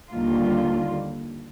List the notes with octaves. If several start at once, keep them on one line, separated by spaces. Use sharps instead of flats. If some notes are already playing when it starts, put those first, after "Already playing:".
D#2 D3 G3 A#3 F4